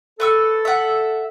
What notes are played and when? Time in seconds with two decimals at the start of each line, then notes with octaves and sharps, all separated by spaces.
0.20 A4 B4 C#6 E6
0.65 E5 F#5